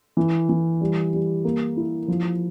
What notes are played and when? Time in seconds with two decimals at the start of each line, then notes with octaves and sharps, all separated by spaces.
0.17 E3
0.49 E3
0.81 G3
1.13 G3
1.45 A#3
1.77 E4
2.08 F3